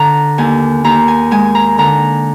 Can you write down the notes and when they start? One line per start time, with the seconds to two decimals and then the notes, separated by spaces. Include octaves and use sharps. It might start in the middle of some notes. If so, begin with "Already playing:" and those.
Already playing: D3 A#5
0.38 D#2 G#5
0.84 D#2 A#5
1.08 G#5
1.31 G#3 G#5
1.55 A#5
1.78 D3 A#5